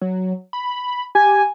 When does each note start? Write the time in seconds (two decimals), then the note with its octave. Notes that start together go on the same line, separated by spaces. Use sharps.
0.01 F#3
0.53 B5
1.15 G4 G#5